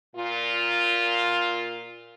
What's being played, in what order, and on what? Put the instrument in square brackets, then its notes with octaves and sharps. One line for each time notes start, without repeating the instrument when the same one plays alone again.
[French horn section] A#2 F4